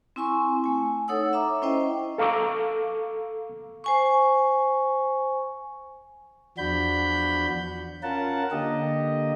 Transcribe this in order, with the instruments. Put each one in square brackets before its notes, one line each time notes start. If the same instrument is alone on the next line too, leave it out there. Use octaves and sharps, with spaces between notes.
[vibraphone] C4 E4 G#5 C6 C#6
A3 G#5
D#4 A4 C#5 F#5 D#6 E6
E5 A#5 D6
C#4 E4 C5 D#5 G5
[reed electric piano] A4 F5 A#5 C#6 D6 E6
[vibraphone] C5 G#5 C#6
[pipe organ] E2 F3 D4 F#4 B5 G6
C#4 F4 A#4 F#5 A5
D3 A#3 G4 D#5